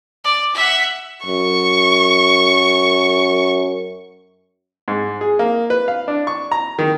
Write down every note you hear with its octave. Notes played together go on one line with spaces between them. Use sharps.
D5
E5 F#5
F#2 C#6
G#2
G#4
A#3
B4
F5
D4
C#6
A#5
D#3